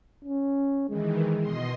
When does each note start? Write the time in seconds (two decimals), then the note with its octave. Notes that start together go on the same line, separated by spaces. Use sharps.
0.25 C#4
0.89 D#3 E3 G#3
1.40 B2 D#5 C6